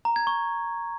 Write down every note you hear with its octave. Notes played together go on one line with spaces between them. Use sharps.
A#5
G#6
C#6